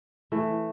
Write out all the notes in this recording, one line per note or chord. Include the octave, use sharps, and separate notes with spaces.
E3 A3